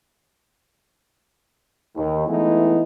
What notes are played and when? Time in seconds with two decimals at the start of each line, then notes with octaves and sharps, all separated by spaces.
1.97 D#2 D#3
2.27 E3 G#3 A3 B3 D#4 E4